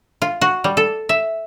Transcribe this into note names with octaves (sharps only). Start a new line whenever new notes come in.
F4
F#4
G3
A4
E5